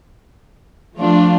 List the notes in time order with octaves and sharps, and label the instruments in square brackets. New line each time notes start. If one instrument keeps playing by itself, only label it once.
[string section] F3 A3 D4 F4